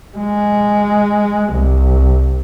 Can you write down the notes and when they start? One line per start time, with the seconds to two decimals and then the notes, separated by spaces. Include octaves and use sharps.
0.17 G#3
1.54 C2